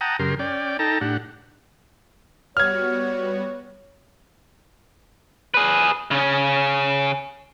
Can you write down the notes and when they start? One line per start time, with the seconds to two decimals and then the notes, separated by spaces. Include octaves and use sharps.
0.01 F#5 G5 A5 A#5 D#6
0.19 F#2 C#3 G4 A#4 C6
0.39 C#4 D5 G5
0.79 D#4 A4 G5 A5 A#5
1.01 A2 D4 G4 F#5
2.57 G3 B3 F#4 C#5 F6 G#6
5.54 G#4 B4
6.11 C#3 C#4